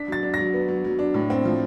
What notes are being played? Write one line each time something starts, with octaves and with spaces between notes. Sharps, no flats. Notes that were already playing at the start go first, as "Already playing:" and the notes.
Already playing: D4 B6
F#3 A6
D4
F#3 A#6
B3
F#3
F#3
D4
A2
C4
F3